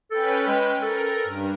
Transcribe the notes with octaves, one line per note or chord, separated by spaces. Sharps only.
C#4 A4 B4 G5
G#3
A4 A#4
G2